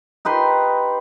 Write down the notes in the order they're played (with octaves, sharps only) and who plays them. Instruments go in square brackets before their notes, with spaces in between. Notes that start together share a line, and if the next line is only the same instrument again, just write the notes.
[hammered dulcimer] D#4 G4 B4 C6